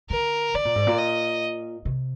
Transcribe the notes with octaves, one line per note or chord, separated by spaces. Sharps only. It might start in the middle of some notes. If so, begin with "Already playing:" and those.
D3 A#4
D3 D5
A#2
G#2
A#2
D#5
C3